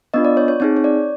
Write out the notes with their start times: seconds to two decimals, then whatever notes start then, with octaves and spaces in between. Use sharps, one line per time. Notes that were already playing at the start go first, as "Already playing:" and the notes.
0.14 B3 D4 F4 D#5
0.25 D5
0.37 C#5
0.48 C#5
0.60 C4 D#4 G#4 C#5
0.77 C#5
0.84 D5